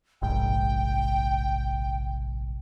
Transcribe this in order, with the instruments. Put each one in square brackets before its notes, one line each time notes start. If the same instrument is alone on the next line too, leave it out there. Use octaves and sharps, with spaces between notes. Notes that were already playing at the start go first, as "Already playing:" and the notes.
[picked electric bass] F1 A#1 G#2 [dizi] G5